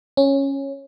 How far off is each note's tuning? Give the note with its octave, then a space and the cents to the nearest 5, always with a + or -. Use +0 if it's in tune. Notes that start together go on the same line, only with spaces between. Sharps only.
C#4 -10